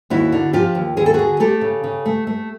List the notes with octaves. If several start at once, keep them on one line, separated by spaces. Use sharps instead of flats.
D#2 E4 F#4
D3
F3 F4 G4
D#2
D#2 G#4
A4
D3 F#4 G#4
A3 G4 A4
C#3
C#3
A3
A3